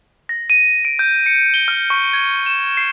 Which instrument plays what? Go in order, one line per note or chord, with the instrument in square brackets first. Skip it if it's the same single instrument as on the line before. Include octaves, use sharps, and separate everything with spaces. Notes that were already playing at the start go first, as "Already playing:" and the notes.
[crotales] A#6
D#7
D7
G6
C#7
G7
F6
C#6
G#6
E7
C7